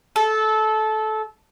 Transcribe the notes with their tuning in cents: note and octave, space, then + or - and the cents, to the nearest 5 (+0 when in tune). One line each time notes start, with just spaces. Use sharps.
A4 -20